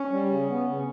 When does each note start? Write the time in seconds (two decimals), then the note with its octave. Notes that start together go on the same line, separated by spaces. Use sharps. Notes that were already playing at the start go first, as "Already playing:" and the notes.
Already playing: C#4
0.11 G3
0.29 C#3
0.48 B3
0.67 C#3